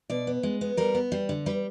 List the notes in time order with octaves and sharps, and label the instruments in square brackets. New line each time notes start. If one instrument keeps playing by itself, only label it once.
[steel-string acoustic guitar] B2 D5
B3
G#3
B3
G3 A#4
B3
G3
D3
G3 B4